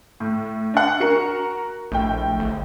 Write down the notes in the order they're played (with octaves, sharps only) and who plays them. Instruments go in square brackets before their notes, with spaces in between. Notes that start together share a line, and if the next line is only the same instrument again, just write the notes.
[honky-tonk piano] A2
D4 F#5
F#4 A#4 C#7
[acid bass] A#1 [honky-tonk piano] A2 G5
[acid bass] G1